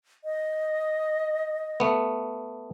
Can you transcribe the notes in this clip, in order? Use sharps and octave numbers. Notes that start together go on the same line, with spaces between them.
D#5
A3 B3